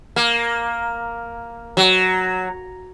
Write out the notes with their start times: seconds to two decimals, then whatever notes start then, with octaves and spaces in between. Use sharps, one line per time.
0.16 A#3
1.77 F#3